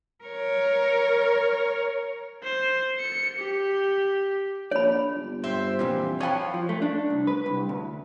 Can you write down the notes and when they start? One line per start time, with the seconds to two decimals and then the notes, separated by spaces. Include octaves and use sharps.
0.24 A#4 C#5
2.43 C5
3.00 C#7
3.38 G4
4.71 A#1 C#5 D5 B5
5.15 G1
5.44 G2 C4 C5 E5
5.79 F2 A#2 E3 G3
6.21 F3 F#3 C#5 F5 G5 B5 C#6
6.54 F3
6.69 A3
6.82 D4
7.10 C2
7.27 B4
7.46 C2
7.69 D2